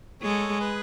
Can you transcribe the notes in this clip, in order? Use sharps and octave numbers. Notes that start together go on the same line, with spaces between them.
G#3 A4 C#5
G#4 B4